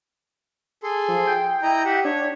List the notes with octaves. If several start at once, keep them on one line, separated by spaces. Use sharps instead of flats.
G#4 A4 C6
F3
G5
E4 D#5 A#5
G4 E5 F#5
D4 C#5